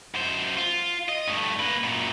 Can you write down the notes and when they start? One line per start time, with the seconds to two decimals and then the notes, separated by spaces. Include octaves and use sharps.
0.14 F#2 C5
0.58 F4
1.09 D#5
1.27 G2 A3
1.60 A#3 B4
1.84 F#2 A#2